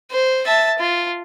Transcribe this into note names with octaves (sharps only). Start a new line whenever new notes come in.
C5
E5 A5
F4